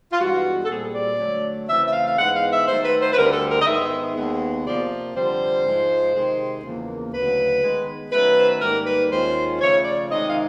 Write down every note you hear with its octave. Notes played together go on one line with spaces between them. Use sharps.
F4
G2 E3 G#3 B3 F#4
A4
A#2 G3 C4 G#4
D5
D3 F#3 A3
C#3 E3 A3 C4 E5
E5
F5
F5
G#2 E3 G#3 B3 F#5
F5
E5
D#3 F#3 A3 C5
B4
C5
B4
D2 D3 G3 C4 A#4
A4
A#4
D#5
G#2 D#3 G#3 B3 D#4 E5
D#2 D#3 G#3 B3
C3 F3 A#3 D5
F2 D3 G3 C5
G#2 F3 G#3
C3 D#3 G#3
E2 C#3 F3 A#3
D2 C#3 F#3 B4
D#3 G#3 B3 D#4
D#3 F#3 A3 C#4 B4
C5
B4
G#2 D#3 G3 A#3 A#4
B4
D#2 D#3 G#3 C#4 F4 C5
C#3 F3 A3 C#5
D5
C3 D#3 G#3 C4 D#4 D#5
F5